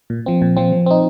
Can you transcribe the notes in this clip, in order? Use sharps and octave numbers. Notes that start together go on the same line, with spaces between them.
A#2
F3 C4
A#2
F3 C4
F3
C4 D#4